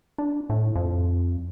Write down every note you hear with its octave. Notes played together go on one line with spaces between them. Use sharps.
D4
A2
F2